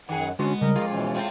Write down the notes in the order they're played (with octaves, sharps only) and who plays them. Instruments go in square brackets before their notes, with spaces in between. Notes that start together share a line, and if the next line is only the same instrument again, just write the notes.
[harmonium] F#2 F#5 [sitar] D#3 G#4
[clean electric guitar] D3 F#4 C6 [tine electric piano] G#3 [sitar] B3 [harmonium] C#4
[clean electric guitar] C#3 G3 [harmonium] A#4 D#5
[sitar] F2 A2 F4 [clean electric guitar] G#4
[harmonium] B2 E3 C#4
[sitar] A2 C4 F4